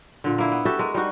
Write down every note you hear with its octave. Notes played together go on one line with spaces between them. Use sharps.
A#2 D3
A#3 E4
B3
F#4 G4 A4 E5
G#3 A#4
G3 D#4 F#4